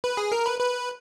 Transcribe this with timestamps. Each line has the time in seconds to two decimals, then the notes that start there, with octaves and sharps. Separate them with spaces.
0.04 B4
0.17 G#4
0.32 A#4
0.46 B4
0.60 B4